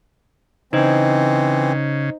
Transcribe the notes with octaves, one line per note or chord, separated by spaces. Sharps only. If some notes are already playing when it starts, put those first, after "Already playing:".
C#3 E3 C4 D#4 C5 D#5